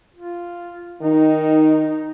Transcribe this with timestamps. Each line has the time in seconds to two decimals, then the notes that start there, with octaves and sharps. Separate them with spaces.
0.16 F4
1.02 D#3 D#4